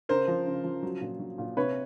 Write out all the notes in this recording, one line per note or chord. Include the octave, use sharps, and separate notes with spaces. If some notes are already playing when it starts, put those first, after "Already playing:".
C#3 A#4 C5
F3
C#3
F3
F#3
A#2
F#3
A#2
C3 B4 C#5